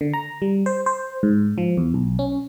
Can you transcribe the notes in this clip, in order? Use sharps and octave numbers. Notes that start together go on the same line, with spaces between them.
D3
A#5
G3
C5
C5
G#2
F3
E2
B1
C#4